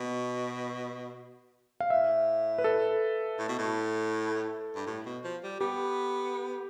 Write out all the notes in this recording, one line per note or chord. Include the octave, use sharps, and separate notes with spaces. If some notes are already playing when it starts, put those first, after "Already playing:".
Already playing: B2
F5
A2 E5
B4
A4
A2
B2
A2
G2
A2
B2
F3
G3
B3 G4